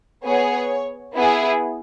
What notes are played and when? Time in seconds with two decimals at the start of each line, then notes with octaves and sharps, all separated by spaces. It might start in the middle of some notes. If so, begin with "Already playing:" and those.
0.24 B3 G#4 C#5
1.15 B3 E4 G#4